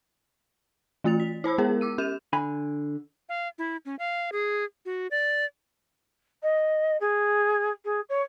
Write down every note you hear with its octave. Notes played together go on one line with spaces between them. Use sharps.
E3 A3 F4 A6 F7
B6
E4 C5 B5 E6
G#3 B3 G#4 A#4
D6 E6 D#7
C#4 G4 G6 E7 F7
D3 G#5 B5
F5
E4
C#4
F5
G#4
F#4
D5
D#5
G#4
G#4
C#5